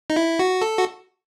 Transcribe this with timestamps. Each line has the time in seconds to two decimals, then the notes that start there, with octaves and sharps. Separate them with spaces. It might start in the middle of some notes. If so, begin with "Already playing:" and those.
0.10 D#4
0.16 E4
0.39 F#4
0.62 A4
0.78 F#4